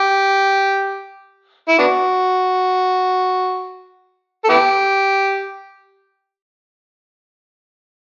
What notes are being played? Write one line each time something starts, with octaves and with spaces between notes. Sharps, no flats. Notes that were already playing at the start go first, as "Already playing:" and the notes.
Already playing: G4
E4
B3 D4 F#4
A4
B3 E4 G4